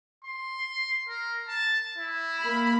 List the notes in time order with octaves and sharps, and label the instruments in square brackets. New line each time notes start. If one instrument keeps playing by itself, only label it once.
[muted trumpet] C6
A#4
A5
E4
[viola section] A#3 B5